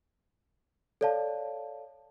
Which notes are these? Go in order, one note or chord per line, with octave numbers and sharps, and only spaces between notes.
A4 C#5 D5 F5 A5